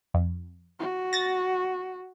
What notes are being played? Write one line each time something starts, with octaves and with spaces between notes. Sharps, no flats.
F2
F#4
A6 A#6